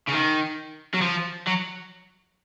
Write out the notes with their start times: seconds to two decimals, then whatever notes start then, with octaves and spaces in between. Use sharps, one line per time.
0.08 C#3
0.13 D#3
0.94 F#3
1.02 F3
1.47 F#3